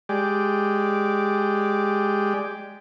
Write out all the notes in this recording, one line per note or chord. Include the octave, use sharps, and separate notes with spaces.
G#3 G4 D5